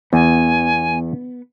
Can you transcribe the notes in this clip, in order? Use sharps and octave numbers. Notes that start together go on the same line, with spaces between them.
E2 B3 G#5